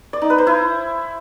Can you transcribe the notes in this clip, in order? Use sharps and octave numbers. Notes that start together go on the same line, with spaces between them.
D5
D#4
B4
C5
E4